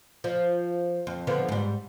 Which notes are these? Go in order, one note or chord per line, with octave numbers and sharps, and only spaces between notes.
F3
F2
D3 F3 B3
G#2 G3